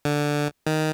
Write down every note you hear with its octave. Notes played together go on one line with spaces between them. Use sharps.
D3
D#3